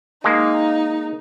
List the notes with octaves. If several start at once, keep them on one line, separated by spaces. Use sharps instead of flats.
G#3 A#3 D#4